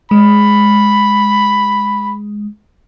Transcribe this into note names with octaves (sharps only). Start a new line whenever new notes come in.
G#3 B5